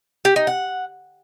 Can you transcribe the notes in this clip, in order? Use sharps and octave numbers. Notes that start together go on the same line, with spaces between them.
G4
D#4
F#5